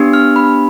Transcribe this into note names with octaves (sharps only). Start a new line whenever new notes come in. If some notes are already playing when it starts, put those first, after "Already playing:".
Already playing: B3 D4 G4
F6
B5